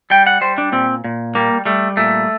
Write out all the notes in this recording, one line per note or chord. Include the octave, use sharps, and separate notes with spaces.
G3 G5
F#5
G3 C5
D4
A#2 C4
A#2
G3 A#3
G3 A3
A#2 A3